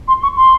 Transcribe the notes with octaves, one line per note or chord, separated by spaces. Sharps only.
C6
C#6
C6